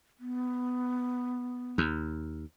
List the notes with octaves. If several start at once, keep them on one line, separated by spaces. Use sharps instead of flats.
B3
D#2